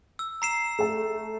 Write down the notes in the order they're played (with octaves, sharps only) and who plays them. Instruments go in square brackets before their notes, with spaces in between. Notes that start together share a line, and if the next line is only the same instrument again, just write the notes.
[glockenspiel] E6
A#5 C7 E7
[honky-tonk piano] A3 A4